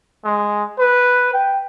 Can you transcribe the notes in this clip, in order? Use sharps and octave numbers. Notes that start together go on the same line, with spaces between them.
G#3
B4
G5